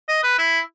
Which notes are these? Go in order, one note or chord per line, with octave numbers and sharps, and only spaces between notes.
D#5
B4
E4